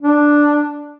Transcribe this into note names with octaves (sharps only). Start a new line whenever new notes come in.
D4